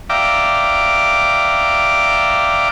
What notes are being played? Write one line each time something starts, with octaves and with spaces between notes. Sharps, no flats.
D5 E5 F5 G5 A#5 D6